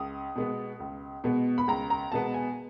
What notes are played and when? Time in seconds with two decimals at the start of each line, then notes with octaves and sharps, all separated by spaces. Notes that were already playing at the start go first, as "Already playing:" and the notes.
Already playing: C#2 D#6
0.36 B2 G#3 B3
0.80 C#2
1.24 B2 G#3 B3
1.58 B5
1.68 C#2 A#5
1.90 A#5
2.12 B2 G#3 B3 A5
2.34 G#5